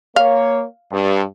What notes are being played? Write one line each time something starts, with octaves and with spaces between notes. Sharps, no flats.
A#3 C#5 F5
G2